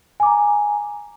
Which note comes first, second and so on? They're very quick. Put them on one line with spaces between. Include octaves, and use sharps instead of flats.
G#5 D6 A#5